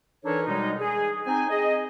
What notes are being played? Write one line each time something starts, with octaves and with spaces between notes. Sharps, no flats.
E3 D4 D#4 A4 A#4 C#5
B2 G3 G#3 D#4
G#4
C4 D#4 C5 G#5
G#4 D#5